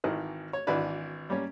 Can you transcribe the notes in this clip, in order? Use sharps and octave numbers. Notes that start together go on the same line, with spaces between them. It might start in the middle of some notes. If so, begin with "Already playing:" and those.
G#1 D#3 E3
C#5
G#1 E3 D4 F#4 B4 D5
G3 A#3 C#4